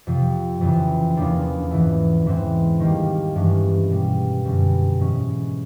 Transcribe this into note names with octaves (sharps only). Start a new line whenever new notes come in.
F2 C3 F3
F2 C#3 E3
E2 C#3 F3 A#3 D4
G#2 E3 A3
G#2 E3 G#3 C4
D#3 G3 A#3
G2 E3 G#3 C#4
B2 G3 A#3
F#2 D3 G3 B3
G#2 E3 G#3 C#4